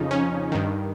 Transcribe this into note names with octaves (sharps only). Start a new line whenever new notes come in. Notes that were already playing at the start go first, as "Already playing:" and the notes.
Already playing: F2 C#3 F3 D#4
C#4
G2 D#3